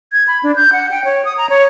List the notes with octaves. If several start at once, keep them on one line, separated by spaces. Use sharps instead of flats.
G#6
B5
D4
G6
F#5
G5
C#5
D#6
A#5
C#5